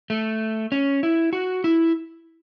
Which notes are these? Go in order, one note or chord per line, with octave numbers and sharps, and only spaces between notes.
A3
C#4
E4
F#4
E4